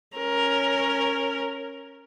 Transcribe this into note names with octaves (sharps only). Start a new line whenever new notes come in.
C#4 A#4